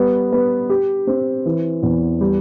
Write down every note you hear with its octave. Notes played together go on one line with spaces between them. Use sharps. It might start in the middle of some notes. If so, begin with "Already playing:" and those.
Already playing: G3 B3
B3
G4
C4
E3
E2
G3